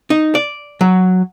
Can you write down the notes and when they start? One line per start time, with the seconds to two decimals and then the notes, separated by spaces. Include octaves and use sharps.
0.10 D#4
0.35 D5
0.81 F#3